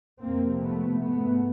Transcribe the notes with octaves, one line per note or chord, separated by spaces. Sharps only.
F2 C3 A#3 C4
A3 B3
G#2 A3 B3